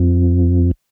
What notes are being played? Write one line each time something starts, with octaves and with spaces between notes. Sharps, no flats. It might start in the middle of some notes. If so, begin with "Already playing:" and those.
Already playing: F2